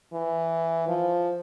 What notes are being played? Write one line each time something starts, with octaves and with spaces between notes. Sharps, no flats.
E3
F3